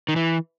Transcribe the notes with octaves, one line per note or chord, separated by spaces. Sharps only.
D#3
E3